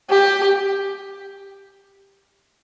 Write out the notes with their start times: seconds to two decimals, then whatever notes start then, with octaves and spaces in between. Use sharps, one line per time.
0.11 G4